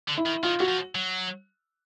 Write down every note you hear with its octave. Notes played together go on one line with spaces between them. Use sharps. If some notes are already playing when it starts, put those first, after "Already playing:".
D3
E4
D#3
D#3 F4
F#4
F3
F#3